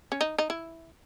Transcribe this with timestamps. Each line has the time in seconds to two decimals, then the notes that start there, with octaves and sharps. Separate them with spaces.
0.12 C#4
0.21 D#4
0.38 D#4
0.50 E4